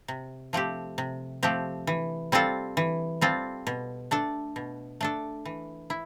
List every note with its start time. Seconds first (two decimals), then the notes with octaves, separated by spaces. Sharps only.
0.08 C3
0.53 F3 A3 C4 G4
0.98 C3
1.43 F3 A3 C4 G4
1.87 E3
2.32 G3 C4 F4 A4
2.77 E3
3.21 G3 C4 F4 A4
3.67 B2
4.11 A3 D4 A4
4.56 B2
5.01 A3 D4 A4
5.45 E3
5.90 E4